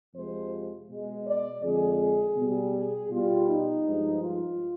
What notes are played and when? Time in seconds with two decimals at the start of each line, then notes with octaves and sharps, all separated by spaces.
0.15 F2 C3 F3 G#3 C5
0.89 B2 G#3
1.26 D5
1.63 F2 D3 G#3 G#4
2.37 B2 G3
2.74 G#4
3.11 B2 G3 F4
3.48 D#4
3.85 G2 F3 G#3
4.22 F4